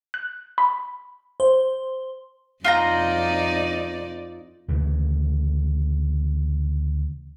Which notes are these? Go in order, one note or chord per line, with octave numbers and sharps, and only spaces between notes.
F#6
B5
C5
F2 D#4 F4 D5 G5 A#5
D2 C#3 E3